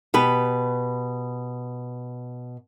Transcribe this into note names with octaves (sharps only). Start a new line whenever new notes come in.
B2 G4 B4